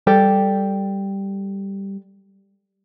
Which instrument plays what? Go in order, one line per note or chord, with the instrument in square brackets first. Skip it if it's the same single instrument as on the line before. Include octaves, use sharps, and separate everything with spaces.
[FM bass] G3 [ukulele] G4 A4 D5